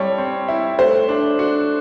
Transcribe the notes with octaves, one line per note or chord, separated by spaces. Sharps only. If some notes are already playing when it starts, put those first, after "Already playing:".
Already playing: G3 C4 E4 A4 C#5
C4
E4
A3 C5
D4
F#4